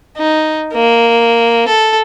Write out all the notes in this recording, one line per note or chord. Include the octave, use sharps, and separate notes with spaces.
D#4
A#3
A4